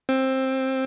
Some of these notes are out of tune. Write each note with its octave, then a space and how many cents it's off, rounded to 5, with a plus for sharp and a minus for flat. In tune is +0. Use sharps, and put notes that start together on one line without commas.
C4 +15